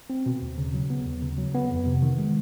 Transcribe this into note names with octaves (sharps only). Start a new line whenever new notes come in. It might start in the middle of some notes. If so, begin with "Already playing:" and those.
C4
B2
D#2
C#3
F#3
B3
D#2
C#3
F#3
B3
F2
C3
D#3
G#3